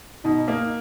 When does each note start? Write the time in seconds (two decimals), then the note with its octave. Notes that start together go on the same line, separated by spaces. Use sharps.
0.25 B2 D#4
0.48 A#3